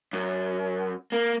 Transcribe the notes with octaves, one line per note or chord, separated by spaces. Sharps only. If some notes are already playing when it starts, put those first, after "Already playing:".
F#2
A#3